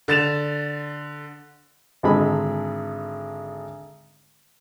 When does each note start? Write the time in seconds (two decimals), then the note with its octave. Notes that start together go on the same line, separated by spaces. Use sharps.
0.08 D3 A6 E7 F7
2.03 G#1 D3 G#3 B5